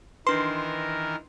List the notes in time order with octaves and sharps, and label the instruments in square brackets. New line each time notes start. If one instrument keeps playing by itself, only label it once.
[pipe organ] D#3 E3 A#4 [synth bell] D4 B4 [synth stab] C6